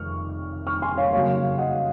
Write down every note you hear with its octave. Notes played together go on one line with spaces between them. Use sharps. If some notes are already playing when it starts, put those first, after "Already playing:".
Already playing: F1 F2 D#3 C#6 F6
C#6 F6
G#5 C6
C#5 F5
F#2 C#3 F#3 A#3 C#5 F5
D#5 F#5